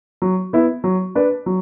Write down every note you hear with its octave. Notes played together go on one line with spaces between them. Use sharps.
F#3
B3 E4
F#3
D4 B4 D5
F#3